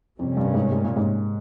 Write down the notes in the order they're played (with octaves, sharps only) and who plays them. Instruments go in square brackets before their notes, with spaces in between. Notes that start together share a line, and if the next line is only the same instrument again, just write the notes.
[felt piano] F2 [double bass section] C3 G3 A#3 C#4
[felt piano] G2
G#2
G#2
A#2
G#2